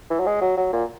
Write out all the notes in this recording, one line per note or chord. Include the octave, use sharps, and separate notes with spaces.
E3
F#3
G#3
F#3
F#3
A#2